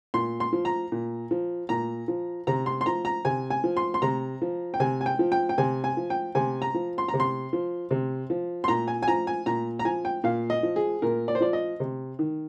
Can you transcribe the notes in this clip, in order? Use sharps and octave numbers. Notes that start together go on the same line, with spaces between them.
A#2 C6
C6
F3
A#5
A#2
F3
A#2 A#5
F3
C3 A#5
C6
C6
F3 A#5
A#5
C3 G#5
G#5
F3
C6
C6
C3 A#5
F3
G5
C3 G#5
G#5
G5
F3
G5
G5
C3 G#5
G#5
F3
G5
C3 G#5
A#5
F3
C6
A#5
C3
C6
F3
C3
F3
C6
A#2 A#5
G#5
G#5
F3 A#5
G#5
A#2 A#5
A#5
F3 G#5
G5
A#2 F5
D#5
F3
G#4
A#2 A#4
D5
C5
F3 D5
D#5
C3
D#3